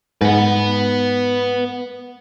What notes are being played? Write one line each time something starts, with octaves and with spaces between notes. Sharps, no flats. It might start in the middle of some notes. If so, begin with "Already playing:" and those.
G#2 B4 F#5